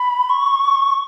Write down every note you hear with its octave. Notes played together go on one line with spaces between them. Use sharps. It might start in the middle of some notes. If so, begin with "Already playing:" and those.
Already playing: B5
C#6